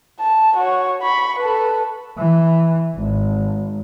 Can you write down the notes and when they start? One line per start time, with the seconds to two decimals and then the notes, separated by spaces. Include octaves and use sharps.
0.20 A5
0.57 F#4 C#5
1.02 B5 C#6
1.39 A4 B4
2.18 E3
2.96 G#1